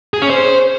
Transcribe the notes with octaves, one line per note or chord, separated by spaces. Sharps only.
G#4
C#4
C5